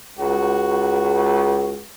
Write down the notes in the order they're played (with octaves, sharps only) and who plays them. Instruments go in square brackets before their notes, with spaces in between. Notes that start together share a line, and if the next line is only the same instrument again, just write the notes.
[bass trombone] C#2 [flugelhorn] F#4